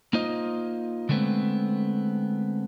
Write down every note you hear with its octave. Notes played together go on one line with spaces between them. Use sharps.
A#3 D#4 F4 C5 D#5
D3 G#3 A3 B3 C4